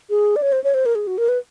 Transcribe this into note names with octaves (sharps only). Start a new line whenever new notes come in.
G#4
D5
C#5
C5
C#5
C5
A#4
G#4
F#4
A#4
B4